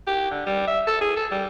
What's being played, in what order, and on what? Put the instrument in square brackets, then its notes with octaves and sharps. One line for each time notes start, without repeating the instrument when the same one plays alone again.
[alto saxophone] G4
D3
G3
E5
A4
G#4
A4
G3